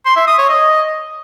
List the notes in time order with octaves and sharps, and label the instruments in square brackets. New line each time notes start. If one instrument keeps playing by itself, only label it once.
[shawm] C6
E5
D#6
C#5
D#5